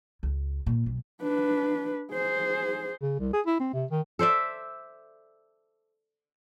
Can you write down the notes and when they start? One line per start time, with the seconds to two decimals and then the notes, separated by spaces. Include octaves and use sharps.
0.23 C#2
0.66 A#2
0.86 B1
1.21 D4 B4
2.12 G#4 C5
3.02 C#3
3.19 C2
3.33 G#4
3.46 E4
3.60 C4
3.73 C3
3.91 D#3
4.19 A4 C5 D5 E5